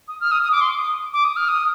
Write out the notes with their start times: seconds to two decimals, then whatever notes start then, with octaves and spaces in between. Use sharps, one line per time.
0.08 D#6
0.21 F6
0.32 D#6
0.43 D#6
0.52 D6
0.61 C6
0.70 D6
0.79 D#6
1.13 D6
1.24 D#6
1.36 F6
1.48 D#6